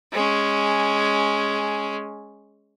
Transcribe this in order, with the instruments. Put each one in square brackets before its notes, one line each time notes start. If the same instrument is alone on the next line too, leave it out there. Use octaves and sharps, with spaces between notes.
[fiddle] G#3 C#4